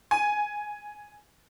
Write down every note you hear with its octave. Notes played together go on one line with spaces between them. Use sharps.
G#5